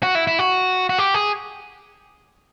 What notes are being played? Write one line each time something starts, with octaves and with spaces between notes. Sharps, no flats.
F#4
E4
E4
F#4
F#4
G4
G#4